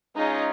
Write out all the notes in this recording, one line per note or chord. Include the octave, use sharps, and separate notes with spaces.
G#3 C#4 D#4 F4 G#4